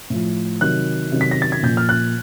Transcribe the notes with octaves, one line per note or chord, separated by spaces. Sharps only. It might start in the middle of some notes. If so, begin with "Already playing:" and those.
A2 F3
C3 D#3 F#3 F#6
C3 D#3 F#3
B6
A#6
A6
G#6
A#2 F3 G6
F6
F#6